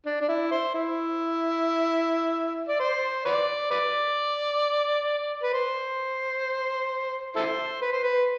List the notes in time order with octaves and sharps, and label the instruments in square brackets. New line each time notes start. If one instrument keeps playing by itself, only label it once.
[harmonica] D4
D4
E4
C5
E4
D5
C5
B4 D5
B4 D5
B4
C5
E4 A4 C5
B4
C5
B4